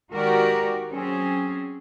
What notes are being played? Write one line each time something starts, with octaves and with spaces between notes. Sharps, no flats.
D#3 G#3 F#4 G4 A#4 D5
F#3 C4 C#4 G#4